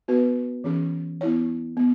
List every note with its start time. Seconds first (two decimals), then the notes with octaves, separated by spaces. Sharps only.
0.08 B3 F#4 B4
0.64 E3 C#4 G#4
1.21 B3 E4 C#5
1.77 B3